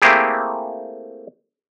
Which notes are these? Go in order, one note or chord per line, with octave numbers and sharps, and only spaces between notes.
A3 A#3 C4 E4 G4 G#4